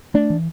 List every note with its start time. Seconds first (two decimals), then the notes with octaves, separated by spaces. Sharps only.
0.14 A3 D4
0.30 E3